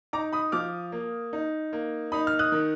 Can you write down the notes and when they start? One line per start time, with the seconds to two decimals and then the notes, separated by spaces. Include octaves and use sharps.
0.13 D#4 A#5 D6
0.32 B5 D#6
0.52 F3 D6 F6
0.92 A#3
1.33 D#4
1.73 A#3
2.12 D#4 B5 D#6
2.27 F6
2.39 D#6 F#6
2.52 D#3